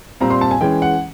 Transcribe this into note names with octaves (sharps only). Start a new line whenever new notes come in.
A#2 G3 C4 A#5
C6
A5
G#5
E3 G#3 C#4 G5
F#5